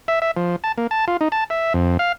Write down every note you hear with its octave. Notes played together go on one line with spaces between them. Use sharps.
E5
E5
F3
A5
A#3
A5
F4
D#4
A5
E5
F2
F5